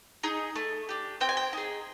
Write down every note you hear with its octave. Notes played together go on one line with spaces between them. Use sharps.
D#4 G#4
A3
D4 G4
C4 G5
G#5
G5
D#4 G#4